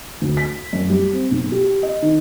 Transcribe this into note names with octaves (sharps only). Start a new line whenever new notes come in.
D2
B6
F#2
G3
C4
B1
G4
D#5
D#3